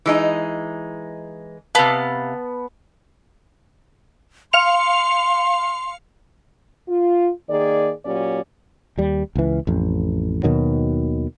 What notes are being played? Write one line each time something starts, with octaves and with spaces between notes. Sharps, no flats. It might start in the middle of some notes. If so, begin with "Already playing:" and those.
E3 G#3 D#4
C3 B3 F5 A5
F5 C6 C#7 F7
F4
D#3 A#3 G#4 D5
A#2 F#3 C#4 G4 D5
D#2 G3
C#2 E3
A1 F2
D#2 B2 D#3 F#3